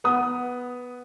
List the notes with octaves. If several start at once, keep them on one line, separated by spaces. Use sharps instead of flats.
B3 D#6